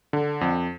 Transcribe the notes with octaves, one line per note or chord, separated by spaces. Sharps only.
D3
F2